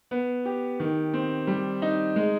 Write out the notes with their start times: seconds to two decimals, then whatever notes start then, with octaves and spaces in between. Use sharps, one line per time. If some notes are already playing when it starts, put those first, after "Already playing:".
0.11 B3
0.45 G4
0.80 D#3
1.14 C4
1.47 G3
1.82 D#4
2.16 G#3